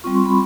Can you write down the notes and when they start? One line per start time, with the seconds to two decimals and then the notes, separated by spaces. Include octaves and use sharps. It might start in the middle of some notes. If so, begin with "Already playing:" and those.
0.04 G3 C4 F4 C#6
0.14 C6
0.26 B5